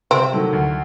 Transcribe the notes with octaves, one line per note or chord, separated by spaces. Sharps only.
C3 C4
D#3 F#3 A3
D2